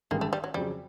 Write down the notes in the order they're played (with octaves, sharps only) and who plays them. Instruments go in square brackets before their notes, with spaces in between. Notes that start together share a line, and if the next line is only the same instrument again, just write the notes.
[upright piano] A1 G2 D#3 G#3 [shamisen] A#3
[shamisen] A3
G3
F#3
[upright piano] F2 C#3 F#3 [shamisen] G3